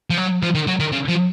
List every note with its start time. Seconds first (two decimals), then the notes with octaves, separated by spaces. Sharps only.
0.10 F3
0.18 F#3
0.43 F3
0.55 D#3
0.67 F#3
0.80 D#3
0.92 C#3
1.09 F3